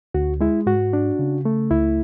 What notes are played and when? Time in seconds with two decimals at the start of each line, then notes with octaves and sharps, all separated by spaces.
0.15 D2 F#4
0.41 G#3 E4
0.66 G#2 F#4
0.93 D4
1.19 C#3
1.45 A3
1.71 C#2 E4